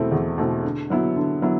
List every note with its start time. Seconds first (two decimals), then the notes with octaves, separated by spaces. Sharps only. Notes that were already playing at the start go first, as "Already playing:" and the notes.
Already playing: E2 B2 A3 C4 E4
0.12 E2
0.38 B2 A3 C4 E4
0.64 D3
0.90 F#3 B3 E4
1.16 D3
1.42 F#3 B3 E4